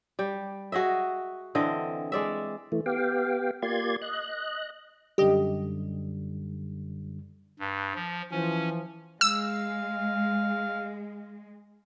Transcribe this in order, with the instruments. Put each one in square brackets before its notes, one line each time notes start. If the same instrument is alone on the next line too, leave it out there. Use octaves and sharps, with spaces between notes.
[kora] G3 G4
F#4 G#4 D#5 E5
D3 E3 C4 D#5
G#3 D5 E5
[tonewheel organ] E3 A3
B3 G4 F5 G5
A#3 F4 G4 D5 C6 G#6
D#5 F#6
[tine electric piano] F#2 D3 G3 [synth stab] G4 D#5
[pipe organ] G2
F3
[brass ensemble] E3 F3 [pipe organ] C#4
[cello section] G#3 [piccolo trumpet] F5 [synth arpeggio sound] E6